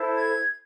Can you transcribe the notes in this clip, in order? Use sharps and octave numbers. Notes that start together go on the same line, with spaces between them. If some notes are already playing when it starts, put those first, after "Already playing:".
Already playing: E4 A4 C5
G#6